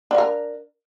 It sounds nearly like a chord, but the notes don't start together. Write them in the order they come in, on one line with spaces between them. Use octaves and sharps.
D4 F5 A#4